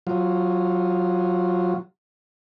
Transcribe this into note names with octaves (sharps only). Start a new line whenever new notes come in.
F#3 F4